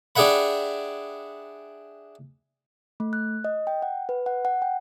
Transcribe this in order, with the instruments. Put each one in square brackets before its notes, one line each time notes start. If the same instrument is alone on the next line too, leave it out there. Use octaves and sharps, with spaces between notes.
[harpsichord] D4 G4 G#4 E5 F#5 B5
[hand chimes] A3
F#6
D#5
G5
F#5
B4
F#5
F#5
G5